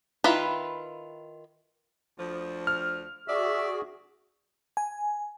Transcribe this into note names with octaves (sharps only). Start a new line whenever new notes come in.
D#3 E4 F4 B4
D2 F3
F6
F#4 G#4 D5 E5
G#5